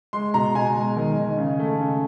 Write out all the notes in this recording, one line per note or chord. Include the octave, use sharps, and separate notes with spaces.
G#3 C6
B2 A#5
B2 G#5
G#3
D#3
D#3
C#3
A3
C#3